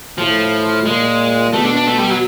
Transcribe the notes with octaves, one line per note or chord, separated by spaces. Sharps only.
A2 F3
A#2 G#3
B2 A3
D4
D4
A3
G3
F#3